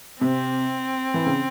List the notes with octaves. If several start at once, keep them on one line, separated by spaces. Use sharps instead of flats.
C3 C4
E3
C#3